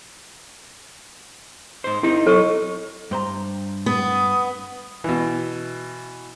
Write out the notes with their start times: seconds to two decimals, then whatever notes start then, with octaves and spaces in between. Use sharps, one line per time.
1.84 G#2 C5
2.03 C4 D#4 E4 A#4
2.27 B1 F#3 A4 D#5 C#6
3.11 G2 C5 A#5
3.86 B3 D#6
5.04 B2 E3